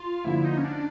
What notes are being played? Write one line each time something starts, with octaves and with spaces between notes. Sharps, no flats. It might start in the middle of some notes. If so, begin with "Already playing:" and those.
Already playing: F4
D3 F3 A#3 E4
D#4
C#4
D4